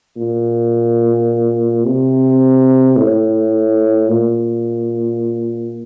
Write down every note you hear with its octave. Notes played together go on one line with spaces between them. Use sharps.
A#2
C3
A2
A#2